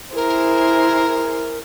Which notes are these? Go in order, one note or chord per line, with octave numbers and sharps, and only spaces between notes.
E4 G#4 A#4 C5